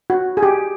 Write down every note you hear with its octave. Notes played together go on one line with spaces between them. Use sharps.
F#4
G#4
G4